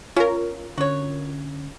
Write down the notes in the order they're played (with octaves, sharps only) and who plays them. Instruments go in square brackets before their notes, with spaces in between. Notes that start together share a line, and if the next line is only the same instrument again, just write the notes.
[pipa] C#4 [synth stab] F4 A#4
[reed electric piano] D3 C#4 [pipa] F#4 C#5